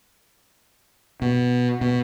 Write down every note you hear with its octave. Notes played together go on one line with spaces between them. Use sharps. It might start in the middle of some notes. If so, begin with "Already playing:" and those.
B2
B2